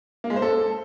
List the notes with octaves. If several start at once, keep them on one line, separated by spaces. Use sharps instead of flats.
A#3
G#3
C5
A4